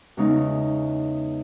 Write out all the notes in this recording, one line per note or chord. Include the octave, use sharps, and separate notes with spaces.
E2 C#3 G#3 D#4